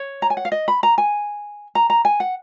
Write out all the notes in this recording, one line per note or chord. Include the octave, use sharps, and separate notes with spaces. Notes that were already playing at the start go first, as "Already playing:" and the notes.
Already playing: C#5
A#5
G#5
F#5
F5
D#5
B5
A#5
G#5
A#5
A#5
G#5
F#5